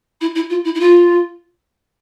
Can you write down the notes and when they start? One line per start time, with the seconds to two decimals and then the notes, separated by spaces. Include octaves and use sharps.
0.21 E4
0.35 E4
0.49 F4
0.64 E4
0.75 E4
0.80 F4